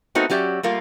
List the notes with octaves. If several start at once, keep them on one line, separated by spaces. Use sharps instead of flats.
A3 B3 C4 D#4 F#4 A#4
F#3 C#4 G4 D5 E5
G3 A3 A#3 F4